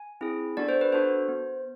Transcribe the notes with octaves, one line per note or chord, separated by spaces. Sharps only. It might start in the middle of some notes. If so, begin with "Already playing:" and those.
Already playing: G#5
C4 E4 G#4
B3 D4 F#4 A4 D5
C5
B4
B3 D4 F#4 A4 C5
B3